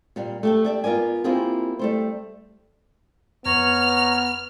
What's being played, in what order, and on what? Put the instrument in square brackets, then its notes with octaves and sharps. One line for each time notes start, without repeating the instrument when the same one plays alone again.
[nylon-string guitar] A#2 G3 F5
A3 G4 A4
G4 D5 E5
B3 F4 A#4 D5 G#5
A#3 C4 E4 F4 G4 G#4
G3 A3 C5
[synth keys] F2 [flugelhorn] B3 [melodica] C#5 A#5 [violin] F6